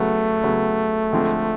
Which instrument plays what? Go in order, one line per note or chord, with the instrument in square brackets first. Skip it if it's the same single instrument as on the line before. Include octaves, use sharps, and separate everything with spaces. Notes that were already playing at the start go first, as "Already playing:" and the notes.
Already playing: [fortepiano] C#3 F#3 B3 [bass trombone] A3
[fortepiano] C#3 F#3 B3
D3 F3 G#3 C4